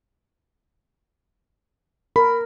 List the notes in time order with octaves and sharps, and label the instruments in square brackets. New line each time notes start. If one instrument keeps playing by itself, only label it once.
[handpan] A#4 [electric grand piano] B5